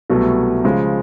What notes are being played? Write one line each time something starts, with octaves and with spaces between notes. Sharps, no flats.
C2 B2 F#3 A3
C#3 F3 G#3